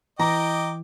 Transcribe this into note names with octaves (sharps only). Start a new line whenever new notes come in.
E3 D#5 G5 A#5 D6